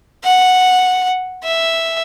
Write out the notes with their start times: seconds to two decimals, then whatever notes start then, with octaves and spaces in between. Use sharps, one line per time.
0.24 F#5
1.44 E5